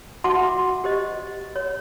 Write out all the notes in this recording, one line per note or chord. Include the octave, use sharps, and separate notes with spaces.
F#4 E5 F#5 A5 C6 D6
G4 C5 D#5
C#5